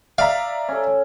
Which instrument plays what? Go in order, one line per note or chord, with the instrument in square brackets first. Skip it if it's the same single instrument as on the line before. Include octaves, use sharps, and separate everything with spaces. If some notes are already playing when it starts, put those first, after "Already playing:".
[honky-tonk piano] D5 E5 A#5 [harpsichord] F5
[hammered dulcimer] C#4 A4